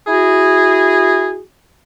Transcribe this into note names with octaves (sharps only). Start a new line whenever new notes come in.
E4 F#4 G#4